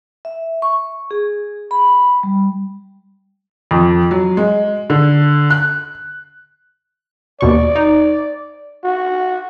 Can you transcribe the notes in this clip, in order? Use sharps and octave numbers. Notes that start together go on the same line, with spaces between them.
E5
C#6
G#4
B5
G3
F2
F#3
G#3
D3
F#6
D#2 B2 D5 C#6
D#4
F#4